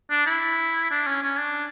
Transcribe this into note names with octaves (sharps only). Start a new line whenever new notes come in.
D4
E4
D4
C#4
C#4
D4